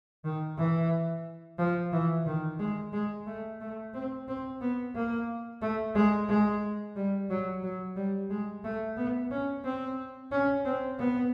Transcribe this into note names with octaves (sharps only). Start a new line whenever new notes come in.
D#3
E3
F3
E3
D#3
G#3
G#3
A3
A3
C4
C4
B3
A#3
A3
G#3
G#3
G3
F#3
F#3
G3
G#3
A3
B3
C#4
C4
C#4
C4
B3